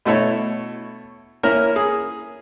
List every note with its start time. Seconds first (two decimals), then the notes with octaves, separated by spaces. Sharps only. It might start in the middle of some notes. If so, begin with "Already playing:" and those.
0.05 B2 A3 E4 C#5
1.43 A#3 C#4 E4 A#4
1.76 G#4